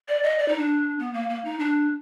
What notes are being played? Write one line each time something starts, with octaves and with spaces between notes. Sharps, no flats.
D5
D#5
D5
D#4
D4
B3
A#3
A#3
D#4
D4